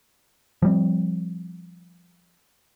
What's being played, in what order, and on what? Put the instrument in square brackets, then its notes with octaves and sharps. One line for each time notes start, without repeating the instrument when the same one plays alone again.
[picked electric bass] F3 G3 C4